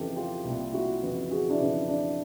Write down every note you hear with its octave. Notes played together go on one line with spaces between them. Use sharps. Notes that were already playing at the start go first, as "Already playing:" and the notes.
Already playing: F2 C#3 E3 G4 A4
F4 G4
C2 A#2
E4 F#4
F2 C#3 E3
F#4 G#4
D4 E4
F2 C#3 E3
D4 E4